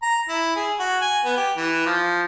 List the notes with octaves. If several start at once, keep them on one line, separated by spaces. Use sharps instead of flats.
A#5
E4
G#4
F#4
G#5
B3
G4
E3
F3